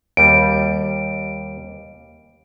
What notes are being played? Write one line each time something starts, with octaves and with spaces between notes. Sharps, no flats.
D#2 G3 D7